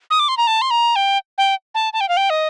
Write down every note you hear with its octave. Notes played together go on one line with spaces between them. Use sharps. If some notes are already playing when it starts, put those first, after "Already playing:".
D#6
D6
C6
A#5
A5
C6
A#5
G5
G5
A5
A5
G5
F5
G5
D#5